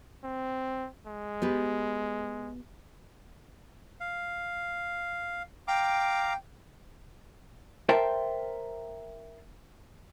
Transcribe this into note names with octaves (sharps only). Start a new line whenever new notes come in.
C4
G#3
B3 G4 B4
F5
F5 G5 A#5 D6
A#4 C5 E5 G5 A5 C6